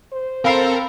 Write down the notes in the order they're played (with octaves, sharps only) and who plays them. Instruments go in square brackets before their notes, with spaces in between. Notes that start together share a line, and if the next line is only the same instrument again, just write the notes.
[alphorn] C5
[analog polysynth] C4 A4 [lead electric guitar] A#4 [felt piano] F5 B5 C7